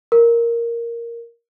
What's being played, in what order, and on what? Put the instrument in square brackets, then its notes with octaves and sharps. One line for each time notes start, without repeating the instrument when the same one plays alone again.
[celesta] A#4